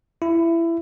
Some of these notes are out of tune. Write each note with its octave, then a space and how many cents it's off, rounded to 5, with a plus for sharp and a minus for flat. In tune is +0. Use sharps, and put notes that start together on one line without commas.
E4 +20